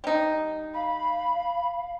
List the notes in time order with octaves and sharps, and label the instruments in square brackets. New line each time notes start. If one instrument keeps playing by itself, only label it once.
[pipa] G3 D#4
[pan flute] F5 [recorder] B5